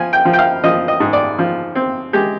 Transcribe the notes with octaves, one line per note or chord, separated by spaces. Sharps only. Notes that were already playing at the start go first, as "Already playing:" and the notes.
Already playing: F3 G#5
G5
F3
G5
F5
F3 D#5
D#5
G#2
D5
F3
C4
G#3 G4